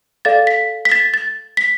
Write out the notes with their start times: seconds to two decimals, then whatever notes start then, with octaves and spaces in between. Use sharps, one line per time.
0.25 A4 D5 F5 A6
0.47 B6
0.85 B6
0.92 A6
1.14 A6
1.57 B6